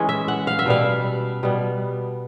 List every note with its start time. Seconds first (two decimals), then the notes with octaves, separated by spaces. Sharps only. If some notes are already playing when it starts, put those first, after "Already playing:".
Already playing: E3 G#3 C#4
0.09 E5
0.28 F#5
0.47 F5
0.59 E5
0.66 B2 G3 B3 F5
1.43 B2 G3 B3